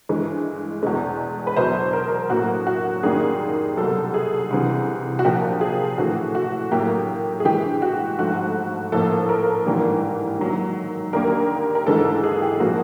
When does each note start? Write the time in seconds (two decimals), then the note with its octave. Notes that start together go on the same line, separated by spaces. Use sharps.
0.09 G2 E3 G#3
0.83 E2 B2 G#3
1.47 B4
1.56 E2 B2 F#3 C5
1.93 A#4
2.30 A2 F#3 A#3 F#4
2.67 F#4
3.03 F#2 D#3 G3 A#3 G#4
3.77 C2 B2 F#3 A4
4.14 G#4
4.50 C2 C3 E3
5.19 F#4
5.24 A#2 F3 A#3 G4
5.61 G#4
5.98 A2 E3 A3 F#4
6.35 F#4
6.71 A2 F#3 A#3 G4
7.40 G#4
7.45 G2 E3 G#3 G4
7.82 F#4
8.19 G#2 F3 A3 F#4
8.92 A2 F3 A#3 A4
9.29 A#4
9.66 G#2 E3 G3 A#3
10.39 G#2 D#3 F#3 A#3
11.13 D#2 D3 G3 A#3 A#4
11.75 A#4
11.87 G#2 E3 G#3 A4
12.05 A4
12.24 G#4
12.42 G4
12.60 A#2 F3 A#3 F#4